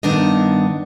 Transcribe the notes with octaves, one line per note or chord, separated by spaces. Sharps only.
G2 D#3 B3 D4 D#4 D#5